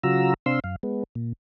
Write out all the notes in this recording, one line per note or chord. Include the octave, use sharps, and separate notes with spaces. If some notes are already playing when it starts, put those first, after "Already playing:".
C#3 F#3 F4 F#4 A#5 E6
C3 C4 D4 F5 C6 E6
F#2 F5
G#3 B3
A#2